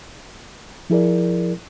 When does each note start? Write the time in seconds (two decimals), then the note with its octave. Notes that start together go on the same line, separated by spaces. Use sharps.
0.90 F3 E4 G#4 A#4 D5